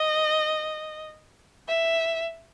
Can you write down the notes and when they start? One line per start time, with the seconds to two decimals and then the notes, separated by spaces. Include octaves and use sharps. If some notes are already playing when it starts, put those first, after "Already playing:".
Already playing: D#5
1.68 E5